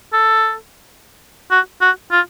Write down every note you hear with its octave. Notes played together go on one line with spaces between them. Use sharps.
A4
F#4
F#4
F4